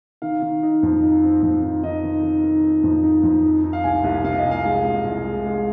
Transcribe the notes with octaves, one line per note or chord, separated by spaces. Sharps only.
D#3 F5
D#3
D#4
F2
D#4
C4
F2
D#3
D#3 D#5
D#3
D#3
D#3
D#3
F2
D#4
F2
D#4
D#4
F5
C2 G#5
C2
C3 F5
D#5
C2
F5
G#3
C2
C2
G#3
G#3